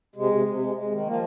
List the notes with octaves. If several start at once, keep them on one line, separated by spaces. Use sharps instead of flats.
C3 G#3
C3
C3
G#3
G#3
D#3
F3 A#3